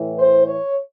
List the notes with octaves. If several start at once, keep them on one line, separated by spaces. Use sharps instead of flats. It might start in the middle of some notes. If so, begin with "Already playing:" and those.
Already playing: A2 E3
C5
C#5